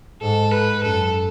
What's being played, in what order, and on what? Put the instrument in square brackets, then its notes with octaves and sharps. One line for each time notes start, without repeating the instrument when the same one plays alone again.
[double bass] G#2 [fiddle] A4
[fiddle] B4
[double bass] F#2 [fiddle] A4